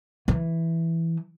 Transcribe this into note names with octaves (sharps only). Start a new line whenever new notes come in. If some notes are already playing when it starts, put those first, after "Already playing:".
E3